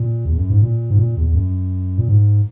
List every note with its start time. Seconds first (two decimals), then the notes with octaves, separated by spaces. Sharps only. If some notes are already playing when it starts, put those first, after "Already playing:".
Already playing: A#2
0.26 E2
0.38 F#2
0.50 G#2
0.62 A#2
0.90 G#2
0.99 A#2
1.17 E2
1.28 E2
1.35 F#2
1.98 A#2
2.08 G#2